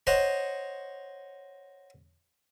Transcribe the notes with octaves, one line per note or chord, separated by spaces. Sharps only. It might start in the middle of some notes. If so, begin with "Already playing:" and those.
C5 C#5 D#5 F#5